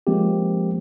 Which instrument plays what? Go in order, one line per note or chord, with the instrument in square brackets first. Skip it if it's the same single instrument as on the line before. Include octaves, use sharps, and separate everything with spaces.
[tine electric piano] F3 G#3 A#3 C4 G4